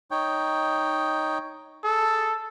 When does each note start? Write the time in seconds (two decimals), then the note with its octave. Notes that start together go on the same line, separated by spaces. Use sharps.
0.11 D#4 C#5 G5
1.84 G#4 A4